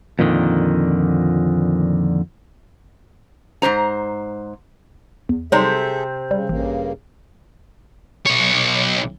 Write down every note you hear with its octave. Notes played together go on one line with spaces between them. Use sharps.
F2 A#2 D3 D#3
G#2 D#3 C5 A#5
E2
C3 F#3 G3 C4 D#4 G#4 A4 E5
C#3 G3
A1 G2 C#3 A#3
B1 C#5